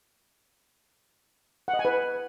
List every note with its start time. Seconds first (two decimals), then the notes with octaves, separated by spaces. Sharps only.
1.68 F#5
1.74 D#5
1.79 G#5
1.85 B4